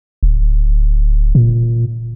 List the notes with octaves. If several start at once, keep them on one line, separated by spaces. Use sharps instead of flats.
D1
A#2